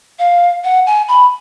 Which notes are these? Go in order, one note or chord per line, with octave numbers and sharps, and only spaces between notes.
F5
F#5
G#5
B5